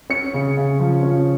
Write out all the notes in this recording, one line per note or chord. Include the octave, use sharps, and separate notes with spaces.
C#4 C#7
C#3
C#3
F3
C#4